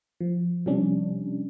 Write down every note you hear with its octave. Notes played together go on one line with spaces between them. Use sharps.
F3
C3 F3 G3 C#4 D4